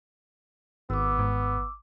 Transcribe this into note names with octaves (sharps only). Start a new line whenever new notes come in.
G#1 B3 D6 E6
G#2